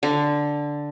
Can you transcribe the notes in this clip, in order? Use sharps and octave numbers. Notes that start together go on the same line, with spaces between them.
D3